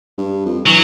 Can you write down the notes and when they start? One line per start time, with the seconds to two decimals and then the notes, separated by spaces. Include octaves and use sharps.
0.18 G2
0.46 F2
0.67 E3 F#3